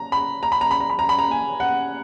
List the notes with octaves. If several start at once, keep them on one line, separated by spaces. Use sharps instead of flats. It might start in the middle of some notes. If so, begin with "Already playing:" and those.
Already playing: A#5
B5
A#5
B5
A#5
B5
A#5
B5
A#5
B5
A#5
G#5
F#5